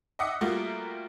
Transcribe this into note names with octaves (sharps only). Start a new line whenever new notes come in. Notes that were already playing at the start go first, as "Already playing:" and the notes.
D#5 E5 F#5 D6 D#6 C#7
G3 A3 A#3 F4 F#4 A#4